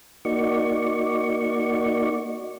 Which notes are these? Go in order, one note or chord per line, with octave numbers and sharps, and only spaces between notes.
A#3 D#4 F#4 D5 C#6